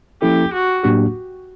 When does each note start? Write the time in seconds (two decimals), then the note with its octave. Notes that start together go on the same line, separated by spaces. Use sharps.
0.22 F3 A#3 C#4 E4 G4 A4
0.53 F#4
0.83 A2 F#3 A#3 D4 G4